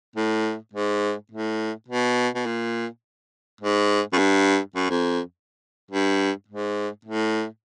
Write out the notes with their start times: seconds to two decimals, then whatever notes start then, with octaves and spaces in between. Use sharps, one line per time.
0.16 A2
0.73 G#2
1.31 A2
1.88 B2
2.35 B2
2.46 A#2
3.61 G#2
4.13 F#2
4.18 G2
4.75 F#2
4.90 F2
5.91 G2
6.48 G#2
7.05 A2